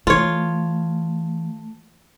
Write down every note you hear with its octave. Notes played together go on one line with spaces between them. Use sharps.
E3 A3 F4 C#5